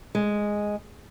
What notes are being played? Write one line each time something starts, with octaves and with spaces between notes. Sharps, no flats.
G#3